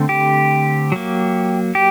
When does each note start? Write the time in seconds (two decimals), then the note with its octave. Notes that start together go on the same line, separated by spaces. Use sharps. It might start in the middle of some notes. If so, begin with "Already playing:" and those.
Already playing: D3 A3 C4
0.09 G4
0.92 F#3 A#3
1.75 G4